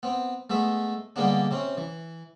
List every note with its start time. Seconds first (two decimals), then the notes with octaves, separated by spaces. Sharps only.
0.03 B3 C4
0.50 G#3 A3 B3 E5
1.16 D3 G3 G#3 A#3 B3 D4
1.51 C3 C4 C#4
1.78 E3